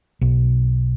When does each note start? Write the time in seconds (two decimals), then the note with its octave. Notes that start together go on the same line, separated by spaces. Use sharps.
0.21 B1